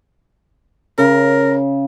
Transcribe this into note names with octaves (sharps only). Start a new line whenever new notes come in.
C#3 A#4